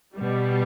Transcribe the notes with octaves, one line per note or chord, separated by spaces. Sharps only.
B2 G3